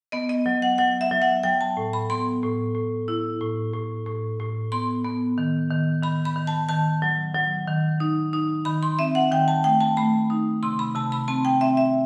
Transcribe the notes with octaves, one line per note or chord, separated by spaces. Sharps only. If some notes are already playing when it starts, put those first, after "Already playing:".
B3 D#5
D#5
F#3
F#5
F#3 F#5
E5
F#3
F#5
F#3 G5
A5
A2
B5
B3 C6
A2
A2
E4
A2
A2
A2
A2
B3 C6
B3
D#3
D#3
D#3 B5
B5
D#3
A5
D#3 A5
F#3
F#3
D#3
D#4
D#4
D#3 B5
C6
C4 E5
F#5
D#3 G5
A5
A3 G5
A5
A3 B5
D#4
C3 C6
B5
C3 A5
B5
C4 A5
G5
C4 E5
E5